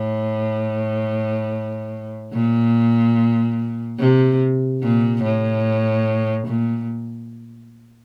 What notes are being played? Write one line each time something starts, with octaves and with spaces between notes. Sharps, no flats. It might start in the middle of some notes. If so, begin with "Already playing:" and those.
Already playing: A2
A#2
C3
A#2
A2
A#2